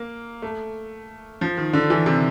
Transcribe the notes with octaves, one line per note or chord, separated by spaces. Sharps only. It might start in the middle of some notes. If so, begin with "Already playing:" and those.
Already playing: A#3
A3
F3
D#3
D3
E3
C3